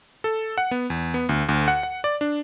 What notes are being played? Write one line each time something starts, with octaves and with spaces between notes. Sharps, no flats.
A4
F#5
B3
E2
B3
D2
D2
F#5
F#5
D5
D4